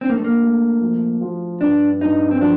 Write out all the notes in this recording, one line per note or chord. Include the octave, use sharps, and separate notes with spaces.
C4 D4
A#3
A3
A#3
A3
F3
F3
G2 D4
G2 D#4
C4
F3 D4